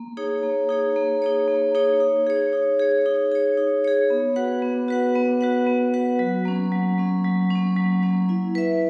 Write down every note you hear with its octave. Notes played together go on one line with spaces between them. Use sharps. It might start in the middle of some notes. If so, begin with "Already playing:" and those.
Already playing: A#3
D#4 G#4 C#5
A#3
D#4 G#4 C#5
A#3
D#4 G#4 C#5
A#3
D#4 G#4 C#5
D#4
G#4 C#5
D#4
G#4 C#5
D#4
G#4 C#5
D#4
G#4 C#5
B3
F#4 B4 F#5
B3
F#4 B4 F#5
B3
F#4 B4 F#5
B3
F#4 B4 F#5
F#3
A#3 C#4
F#3
A#3 C#4
F#3
C#4
A#3
F#3
A#3 C#4
E4
B4 E5